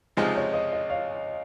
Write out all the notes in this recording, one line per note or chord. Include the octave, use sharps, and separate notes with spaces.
C#2 C3 F3 G#3 D#4 D#5
C#5
D#5
D#5
C#5 F5